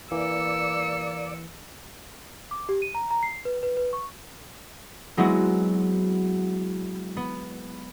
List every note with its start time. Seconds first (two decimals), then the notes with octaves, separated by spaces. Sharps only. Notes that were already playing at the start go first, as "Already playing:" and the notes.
0.12 E3 A#3 D5 E6 C#7
2.51 D6
2.69 G4
2.82 D#7
2.95 A#5
3.11 A#5
3.23 C7
3.45 B4
3.63 B4
3.77 B4
3.93 C#6
5.17 F#3 G#3 B3 C4 E4 F#4
7.17 B3